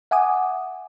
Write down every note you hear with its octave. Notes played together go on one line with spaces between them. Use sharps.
E5 F#5 G#5 D6 D#6